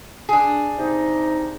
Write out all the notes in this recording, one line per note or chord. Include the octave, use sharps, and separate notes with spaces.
D4 G#4
C3 D#4